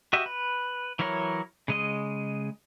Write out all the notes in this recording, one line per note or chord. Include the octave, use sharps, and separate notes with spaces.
F#4 G4 D#5 E5
B4
E3 F#3 E4 A#4 C#5
C#3 G#3 D#5